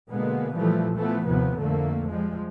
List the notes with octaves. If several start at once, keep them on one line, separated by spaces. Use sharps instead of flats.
B2 D3 G#3 A#3 B3
A#2 E3 F3 G3 A3
E3 F3 A3 B3
D#2 A2 C3 F3 B3
F2 D3 A3 A#3
F3 G3 G#3